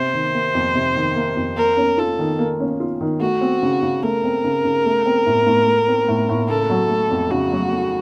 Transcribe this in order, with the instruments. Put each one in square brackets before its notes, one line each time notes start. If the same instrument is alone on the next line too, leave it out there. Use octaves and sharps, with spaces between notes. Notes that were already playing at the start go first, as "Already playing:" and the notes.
Already playing: [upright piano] C3 [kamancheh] C5
[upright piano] D#3
A#3
F2
C3
D#3
A#3
F2
[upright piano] A#3 [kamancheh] A#4
[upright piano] C#4
[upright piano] F4 [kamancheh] A4
[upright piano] D#3
A#3
C#4
F4
D#3
[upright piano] A3 [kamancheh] F#4
[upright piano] C4
C#3
C#3
[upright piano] A3 [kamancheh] A#4
[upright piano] C4
C#3
C#3
A3
C4
A2
A2
A3
C4
A2
A2
[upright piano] C#3 [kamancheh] A4
[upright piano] F#3
A3
F2
[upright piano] C#3 [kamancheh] F#4
[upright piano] F#3
A3